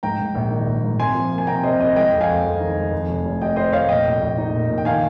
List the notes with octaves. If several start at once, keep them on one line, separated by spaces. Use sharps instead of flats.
G#2 G5 A#5
G#2
A#1
D#3
A#1
G#2
C3 G#5 C6
F3
A#3
G#5
C3 G5 A#5
C3 C5 D#5
C2 D#5 G5
G#3 D#5 G5
F2
F5 G#5
F2
F2
D#3
G#3
F2
F1
F1
F1 D#5 G5
F1 C5 D#5
F1 C#5 F5
A#2 D#5 G5
A#1
A#1
D#4
A#2
A#2
G5
D#3 F5 G#5